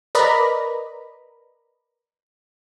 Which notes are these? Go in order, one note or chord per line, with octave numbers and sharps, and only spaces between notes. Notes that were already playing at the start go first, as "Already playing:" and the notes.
A#4 B4 D5 D#5 A#5 B5